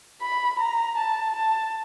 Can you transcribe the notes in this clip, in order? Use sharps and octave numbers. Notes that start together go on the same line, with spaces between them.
B5
A#5
A5
A5